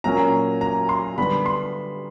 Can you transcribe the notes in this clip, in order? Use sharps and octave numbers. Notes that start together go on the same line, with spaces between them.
A#2 F#3 A#3 C#4 A#5
A#5
C6
D3 G3 B3 B5
C6